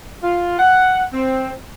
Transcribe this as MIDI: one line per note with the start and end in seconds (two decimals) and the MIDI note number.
0.23 0.57 65
0.59 1.03 78
1.13 1.53 60